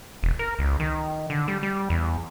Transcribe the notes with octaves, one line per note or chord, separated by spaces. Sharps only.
E1
A#4
C#2
D#3
D3
G3
G3
E2